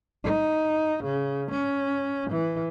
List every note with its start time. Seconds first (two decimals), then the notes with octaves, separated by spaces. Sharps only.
0.24 D#4
1.04 C#3
1.52 C#4
2.31 E3